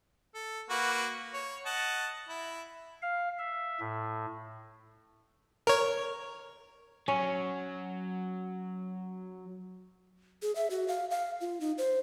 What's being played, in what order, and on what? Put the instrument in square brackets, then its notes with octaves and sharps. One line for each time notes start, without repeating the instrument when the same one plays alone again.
[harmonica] A4
A#3 F#4 B4
C#5
D#5 F#5 A5
E4
[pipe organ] F5
E5
A2
[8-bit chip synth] A#4 C#5
[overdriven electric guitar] F#3 [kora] C#4
[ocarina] G#4
E5
F#4
F5
F5
F4
D#4
C5